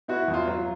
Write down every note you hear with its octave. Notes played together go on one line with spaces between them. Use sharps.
B3 E4 F#4
E2
F4
F#3